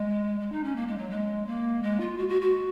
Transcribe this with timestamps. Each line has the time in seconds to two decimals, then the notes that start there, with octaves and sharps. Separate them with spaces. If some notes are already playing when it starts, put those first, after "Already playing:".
Already playing: G#3
0.40 G#3
0.52 D#4
0.64 C#4
0.76 A#3
0.87 G#3
0.98 F#3
1.10 G#3
1.47 A#3
1.82 G#3
2.00 F4
2.18 F#4
2.29 F#4
2.41 F#4